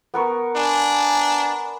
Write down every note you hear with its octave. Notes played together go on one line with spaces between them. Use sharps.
B3 A#4 C#6
D4 G#5